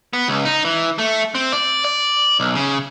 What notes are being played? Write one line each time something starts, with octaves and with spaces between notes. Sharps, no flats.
B3
C#2
D#4
E3
A3
C4
D5
D5
B1
C#3